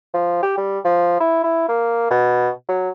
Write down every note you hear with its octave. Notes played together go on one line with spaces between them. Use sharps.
F3
G4
G3
F3
E4
E4
A#3
B2
F#3